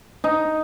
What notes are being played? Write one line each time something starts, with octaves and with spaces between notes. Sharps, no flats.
D#4